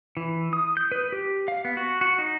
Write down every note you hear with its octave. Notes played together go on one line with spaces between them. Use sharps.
E3
D#6
G6
B4
G4
F5
B3
F#4
F#4
D#4